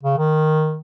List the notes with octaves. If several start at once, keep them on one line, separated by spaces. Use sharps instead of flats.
C#3
D#3